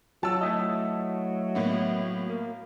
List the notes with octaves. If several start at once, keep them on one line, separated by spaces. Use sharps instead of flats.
F#3 F4 A5 E6
F#3 A3 E4 D#5
A2 A#3 B3
A#3